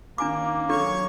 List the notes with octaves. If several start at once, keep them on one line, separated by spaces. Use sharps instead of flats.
D#3 A#3 C#4 D4 G#5 D6
F#3 D4 A4 C#5 C#6